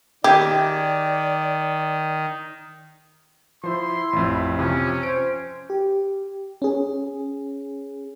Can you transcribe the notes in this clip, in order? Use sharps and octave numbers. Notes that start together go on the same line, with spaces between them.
D#3 G4 G#4 D5 E5
F3 E4 C5 C6
A1 F2
C3 F3 C#4
C5 D7
G4
C#4 G#4